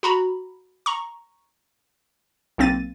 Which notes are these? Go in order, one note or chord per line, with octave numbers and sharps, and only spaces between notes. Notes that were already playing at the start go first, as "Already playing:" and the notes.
F#4 A#5 B5
A#5 C#6
B1 A#3 C4 A6 D#7